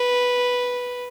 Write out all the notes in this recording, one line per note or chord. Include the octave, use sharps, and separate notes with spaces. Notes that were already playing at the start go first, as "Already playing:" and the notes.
Already playing: B4